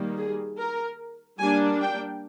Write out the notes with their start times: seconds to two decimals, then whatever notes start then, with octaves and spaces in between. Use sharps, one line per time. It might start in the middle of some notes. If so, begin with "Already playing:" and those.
Already playing: D#3 G3 A#3
0.17 G#4
0.58 A#4
1.39 G3 A#3 D4 G#5
1.81 G5